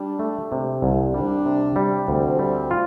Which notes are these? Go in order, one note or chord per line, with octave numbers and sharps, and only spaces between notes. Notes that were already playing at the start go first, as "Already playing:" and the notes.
Already playing: G3 D4
A3
C3
C2
G3 D4
C3
G3
D2 C4
G3
F4